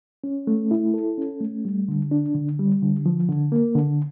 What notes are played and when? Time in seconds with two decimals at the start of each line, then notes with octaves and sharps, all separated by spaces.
0.24 C#4
0.47 A3
0.71 E4
0.94 A4
1.18 C#4
1.41 A3
1.65 G3
1.88 D3
2.11 D4
2.34 D3
2.59 G3
2.83 D3
3.06 F3
3.29 D3
3.52 A#3
3.75 D3